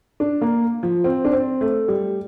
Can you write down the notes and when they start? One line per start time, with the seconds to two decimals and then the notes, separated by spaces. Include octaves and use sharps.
0.20 D4
0.41 A#3
0.83 F3
1.04 C4
1.25 D4
1.32 C4
1.61 A3
1.88 G3